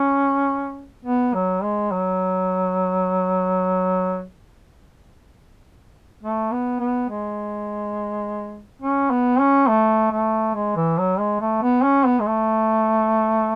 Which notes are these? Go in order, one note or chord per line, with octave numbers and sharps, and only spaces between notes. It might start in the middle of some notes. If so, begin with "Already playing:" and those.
Already playing: C#4
B3
F#3
G#3
F#3
A3
B3
B3
G#3
C#4
B3
C#4
A3
A3
G#3
E3
F#3
G#3
A3
B3
C#4
B3
G#3
A3